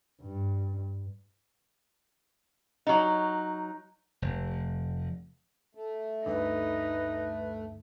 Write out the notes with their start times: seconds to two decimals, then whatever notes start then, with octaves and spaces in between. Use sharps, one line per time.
0.21 G2
2.87 F#3 D#4
4.22 F1
5.75 A3
6.26 D2 G2 D3 D#4 B4